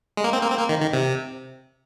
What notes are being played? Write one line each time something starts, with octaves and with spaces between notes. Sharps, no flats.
G#3
A#3
C4
A#3
C4
A#3
D#3
D#3
C3